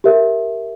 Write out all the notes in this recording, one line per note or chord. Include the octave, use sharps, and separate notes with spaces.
G4 A#4 E5